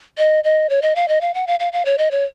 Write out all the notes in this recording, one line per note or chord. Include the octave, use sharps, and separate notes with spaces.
D#5
D#5
C#5
D#5
F5
D#5
F5
F#5
F5
F5
F5
C#5
D#5
C#5